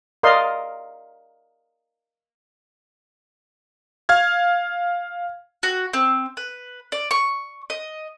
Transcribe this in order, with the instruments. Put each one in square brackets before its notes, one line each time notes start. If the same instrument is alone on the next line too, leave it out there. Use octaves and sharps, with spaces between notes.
[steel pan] A#4 D5 D#5 F5 C6
[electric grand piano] F5 F6 G#6
[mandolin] F#4
C4
B4
D5
C#6
D#5